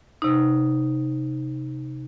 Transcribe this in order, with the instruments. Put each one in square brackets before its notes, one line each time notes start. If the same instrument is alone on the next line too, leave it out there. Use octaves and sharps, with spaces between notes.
[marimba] C3 D#4